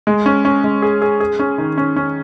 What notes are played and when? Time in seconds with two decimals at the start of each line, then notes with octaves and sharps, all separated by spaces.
0.07 G#3
0.26 C#4
0.45 C#4
0.64 G#3
0.82 G#4
1.02 G#4
1.20 G#4
1.39 C#4
1.58 D#3
1.78 C#4
1.96 C#4